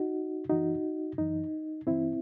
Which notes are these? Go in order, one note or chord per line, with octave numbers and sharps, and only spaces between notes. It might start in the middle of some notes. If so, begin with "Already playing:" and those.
Already playing: D#4 F#4
F#2 E3 D#4 F#4
F#2 E3 D#4
G2 E3 C4 E4